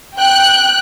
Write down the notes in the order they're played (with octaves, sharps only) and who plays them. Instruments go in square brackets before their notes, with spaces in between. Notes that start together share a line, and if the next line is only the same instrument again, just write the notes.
[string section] G5 F#6